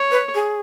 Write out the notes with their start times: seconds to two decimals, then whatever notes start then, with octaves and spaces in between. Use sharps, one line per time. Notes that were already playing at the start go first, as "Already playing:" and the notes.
Already playing: C#5
0.11 B4
0.35 G#4